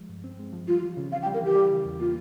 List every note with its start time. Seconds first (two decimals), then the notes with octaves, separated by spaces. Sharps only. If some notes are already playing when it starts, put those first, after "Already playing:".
Already playing: F3 G#3
0.09 G2
0.24 C4
0.39 G#3
0.53 F3
0.67 G3 F4
0.82 E3
0.97 C#3
1.12 C4 F5
1.22 G5
1.26 G3
1.34 A#4
1.41 E3 G4
1.55 G3
1.70 C#3
1.85 E2
2.00 A#3 F4